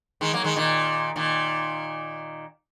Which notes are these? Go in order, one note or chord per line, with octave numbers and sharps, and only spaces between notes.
D#3 G#3
F#3 A#3
D#3 G#3
A#2 D#3
A#2 D#3